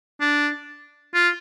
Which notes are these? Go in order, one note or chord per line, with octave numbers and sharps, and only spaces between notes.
D4
F4